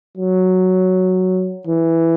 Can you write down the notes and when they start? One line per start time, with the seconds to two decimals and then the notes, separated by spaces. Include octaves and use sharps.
0.18 F#3
1.67 E3